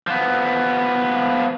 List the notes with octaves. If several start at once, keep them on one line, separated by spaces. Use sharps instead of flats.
F3 B3